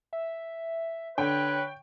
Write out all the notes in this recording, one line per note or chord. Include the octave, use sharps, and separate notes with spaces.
E5
D3 B4 C#5 G5